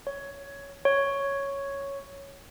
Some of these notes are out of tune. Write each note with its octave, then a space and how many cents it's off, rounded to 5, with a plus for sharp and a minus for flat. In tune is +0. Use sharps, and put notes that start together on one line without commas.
C#5 +10
C#5 +0